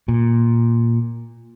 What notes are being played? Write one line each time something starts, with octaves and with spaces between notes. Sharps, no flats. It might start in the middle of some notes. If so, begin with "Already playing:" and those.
A#2